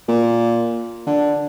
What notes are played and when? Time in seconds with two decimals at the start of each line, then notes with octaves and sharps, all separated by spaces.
0.08 A#2
1.07 D3